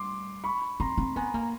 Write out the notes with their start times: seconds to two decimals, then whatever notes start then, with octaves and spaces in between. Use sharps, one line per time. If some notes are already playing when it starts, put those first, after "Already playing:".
Already playing: G3 C6 D6
0.44 B5 C#6
0.80 C4 A#5 C6
0.98 C4
1.16 B3 G#5 A#5
1.34 A#3